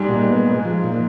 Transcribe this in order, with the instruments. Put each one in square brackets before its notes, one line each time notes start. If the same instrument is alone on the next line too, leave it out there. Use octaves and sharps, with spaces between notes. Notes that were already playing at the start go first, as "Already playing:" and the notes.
Already playing: [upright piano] G#2 G#3 [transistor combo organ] G3
[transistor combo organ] A#2
B3
G#3
F3
A#2